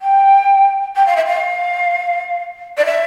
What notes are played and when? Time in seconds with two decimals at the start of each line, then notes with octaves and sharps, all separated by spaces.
0.01 G5
0.95 G5
1.06 F5
1.16 E5
1.25 F5
2.77 D5
2.85 E5